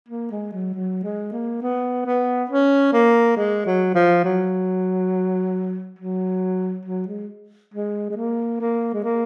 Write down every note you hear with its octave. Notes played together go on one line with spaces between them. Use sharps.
A#3
G#3
F#3
F#3
G#3
A#3
B3
B3
C#4
A#3
G#3
F#3
F3
F#3
F#3
F#3
G#3
G#3
G#3
A#3
A#3
G#3
A#3